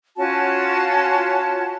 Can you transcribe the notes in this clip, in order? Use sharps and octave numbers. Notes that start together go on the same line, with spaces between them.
C#4 F4 F#4 A5